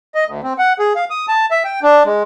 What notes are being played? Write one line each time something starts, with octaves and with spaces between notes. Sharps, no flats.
D#5
D2
C4
F#5
G#4
F5
D#6
A5
E5
G5
D4
G#3